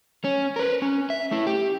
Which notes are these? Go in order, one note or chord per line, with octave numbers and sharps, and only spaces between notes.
C#4
A#4 B4
C#4
E5
A3 E4
G4